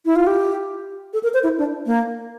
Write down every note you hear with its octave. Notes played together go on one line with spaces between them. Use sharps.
E4
F4
G4
A4
A#4
C5
E4
D4
A#3